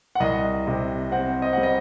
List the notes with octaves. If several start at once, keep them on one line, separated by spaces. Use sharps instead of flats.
F#5
C2 D#5
C3
C4 F#5
D#5
G3 F#5
D#5